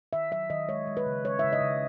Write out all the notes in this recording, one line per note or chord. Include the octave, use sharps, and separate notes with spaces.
D#3 E5
F#3 E5
D#3 D#5
G#3 C#5
G#3
B4
C#3
G#3 C#5
C#3 E5
D#5
C#3